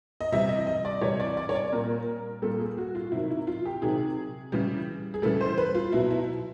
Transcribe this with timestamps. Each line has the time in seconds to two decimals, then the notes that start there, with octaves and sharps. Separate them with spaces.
0.21 D#5
0.32 C3 E3 G3 E5
0.49 D#5
0.67 D#5
0.85 D5
1.01 C3 E3 G3 C#5
1.20 D5
1.37 D5
1.49 C#5
1.55 D5
1.72 A#2 G3 A#4
2.42 A#2 G3 A4
2.59 G#4
2.78 F#4
2.95 F4
3.12 C3 D#3 F#3 E4
3.30 E4
3.47 F4
3.66 G4
3.82 C3 D#3 F#3 G#4
4.52 C#3 E3 G3
5.14 G#4
5.22 C#3 E3 G3 A4
5.41 C5
5.58 B4
5.75 F4
5.92 B2 F#3 E4
6.11 E4